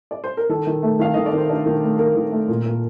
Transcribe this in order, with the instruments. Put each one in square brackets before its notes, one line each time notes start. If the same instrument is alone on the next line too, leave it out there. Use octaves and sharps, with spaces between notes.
[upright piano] D5
C5
A#4
D#3 A4
D#3
A3
D#3 F5
D#3 D#5
D5
D#3 C5
D4 A#4
D#3
A3
A4
A3 A#4
D#3
A3
A#2
A#2